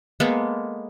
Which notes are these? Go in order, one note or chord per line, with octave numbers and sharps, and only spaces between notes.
G#3 A#3 B3 A4